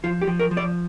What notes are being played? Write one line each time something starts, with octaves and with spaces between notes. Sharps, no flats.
F3 F4
G4
F3
A#4
F3
D5